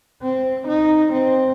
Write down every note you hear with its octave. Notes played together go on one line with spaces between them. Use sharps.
C4
D#4
C4